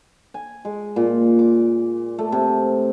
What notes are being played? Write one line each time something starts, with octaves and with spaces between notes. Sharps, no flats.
G#5
G#3
A#2
D6
A3
C3